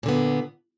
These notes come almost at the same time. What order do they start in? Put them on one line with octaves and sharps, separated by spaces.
A#2 D3 B3